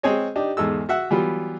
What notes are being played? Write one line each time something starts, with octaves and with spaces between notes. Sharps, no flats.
G#3 C4 G#4 C#5 D#5
D4 D#4 G4
E2 G#2 D#4 A4 E6
F#4 E5 F#5
E3 F#3 G3 B3 F4